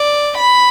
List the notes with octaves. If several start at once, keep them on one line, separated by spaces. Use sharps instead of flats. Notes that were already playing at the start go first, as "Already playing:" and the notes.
Already playing: D5
B5